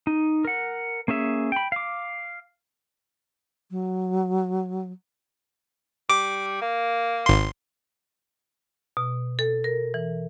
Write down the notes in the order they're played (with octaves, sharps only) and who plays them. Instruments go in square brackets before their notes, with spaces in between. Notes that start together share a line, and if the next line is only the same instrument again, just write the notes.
[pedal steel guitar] D#4
A#4 F#5
A#3 C#4 G#4 E5
G5 B5
F5 D6
[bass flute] F#3
[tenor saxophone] G3 [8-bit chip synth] D6
[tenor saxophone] A#3
[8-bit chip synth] G#1 C6
[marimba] B2
A4
A#4
E3